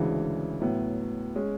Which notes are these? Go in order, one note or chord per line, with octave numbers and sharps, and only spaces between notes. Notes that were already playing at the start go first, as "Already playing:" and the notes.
Already playing: D2 C#3 E3 G#3 D4
A2 F#3 B3 E4
G#3 C#4